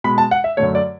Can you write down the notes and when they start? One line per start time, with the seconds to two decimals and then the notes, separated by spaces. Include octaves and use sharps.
0.04 B2 G#3 B5
0.18 A5
0.31 F#5
0.44 E5
0.57 F#2 D3 A3 C#5
0.75 D5